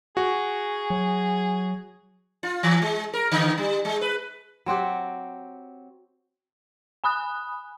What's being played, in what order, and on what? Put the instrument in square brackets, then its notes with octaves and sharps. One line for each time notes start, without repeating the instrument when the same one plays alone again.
[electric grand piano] F#4 [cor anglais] G#4
[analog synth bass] F#3
[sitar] F4
E3
G#3
A#4
D3
G3
G#3
B4
[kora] F#3 C4 F#4 G4
[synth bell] G#5 B5 D#6 F#6